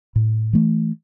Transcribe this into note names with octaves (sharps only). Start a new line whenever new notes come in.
A2
E3 A3